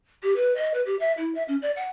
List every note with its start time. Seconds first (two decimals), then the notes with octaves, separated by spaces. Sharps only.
0.23 G4
0.36 B4
0.56 D#5
0.74 B4
0.86 G4
0.99 E5
1.17 E4
1.35 E5
1.48 C#4
1.62 D5
1.76 F#5